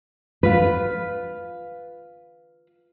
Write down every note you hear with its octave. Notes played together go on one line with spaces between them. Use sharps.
F4 B4